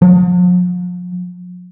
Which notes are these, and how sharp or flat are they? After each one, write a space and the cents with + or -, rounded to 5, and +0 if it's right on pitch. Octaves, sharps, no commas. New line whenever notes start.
F3 +40